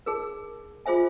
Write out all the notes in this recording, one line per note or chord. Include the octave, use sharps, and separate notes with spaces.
D#4 G#4 A#4
F4 G#4 C5 E5 G#5